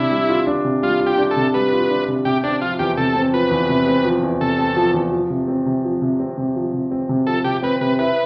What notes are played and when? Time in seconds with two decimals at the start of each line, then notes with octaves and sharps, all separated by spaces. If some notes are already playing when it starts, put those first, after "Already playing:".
Already playing: C3 G3 D4 E4
0.11 G3
0.29 F4
0.47 D4
0.65 C3
0.82 G3 F4
1.01 F4
1.07 G4
1.18 D4
1.31 A4
1.36 C3
1.54 G3 B4
1.72 F4
1.90 D4
2.08 C3
2.25 C3 G4
2.43 C4 D4
2.61 F3 F4
2.79 E2 G4
2.97 C3 A4
3.15 C4
3.33 F3 B4
3.51 E2
3.69 C3
3.87 C4
4.04 F3
4.23 E2
4.40 C3 A4
4.59 C4
4.76 F3
4.94 E2
5.12 F3
5.30 C3
5.48 C4
5.66 C3
5.84 F3
6.02 C3
6.20 C4
6.37 C3
6.55 F3
6.73 C3
6.91 C4
7.09 C3
7.27 F3 A4
7.44 C3 G4
7.62 C4 B4
7.81 C3 B4
7.99 E4 B4